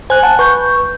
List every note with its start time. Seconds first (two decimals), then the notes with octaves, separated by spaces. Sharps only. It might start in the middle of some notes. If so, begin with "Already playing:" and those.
0.10 C5 G#5 F#6
0.23 F#5 A5
0.39 B4 C#6 G6